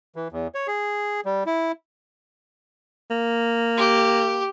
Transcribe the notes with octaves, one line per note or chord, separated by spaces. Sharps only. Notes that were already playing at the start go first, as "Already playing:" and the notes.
E3
E2
C#5
G#4
G3
E4
A#3
G4